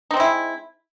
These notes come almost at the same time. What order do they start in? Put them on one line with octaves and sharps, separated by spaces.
D#4 C4 G#3 E4